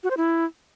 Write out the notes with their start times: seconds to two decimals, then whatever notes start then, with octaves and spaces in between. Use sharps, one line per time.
0.04 F#4
0.10 C5
0.17 E4